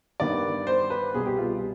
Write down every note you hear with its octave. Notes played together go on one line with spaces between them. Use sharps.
G2 D#3 B3 D5
C5
B4
C2 B2 G3 B3 G#4
G4
F4